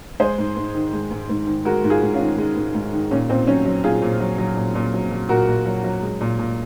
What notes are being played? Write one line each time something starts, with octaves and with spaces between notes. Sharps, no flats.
G#3 G#4 C5
G#2
G#2
D#3
G#3
G#2
G#2
D#3
G#3 F#4 A#4
G#2
F4 G#4
G#2
C#4 F4
D#3
G#3
G#2
G#2
D#3
A#2 C#4
A#2 C4
F#3 C#4
F#3
A#2 F4 G#4
A#2
F#3
F#3
A#2
A#2
F#3
F#3
A#2 F#4 A#4
A#2
F#3
F#3
G#3
A#2
A#2